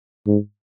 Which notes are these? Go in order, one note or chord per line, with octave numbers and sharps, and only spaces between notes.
G#2